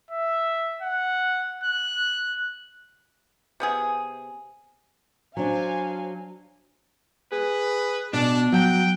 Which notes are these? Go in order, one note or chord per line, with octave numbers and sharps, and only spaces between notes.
E5
F#5
F#6
C3 B3 G#4
F#3 D4 C5 F5 G#5
G#4 B4
B2 D4
F#3 F#5 G5